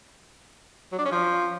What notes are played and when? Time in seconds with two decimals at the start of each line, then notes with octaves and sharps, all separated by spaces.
0.92 F#3
0.99 D4
1.05 C#4
1.12 F3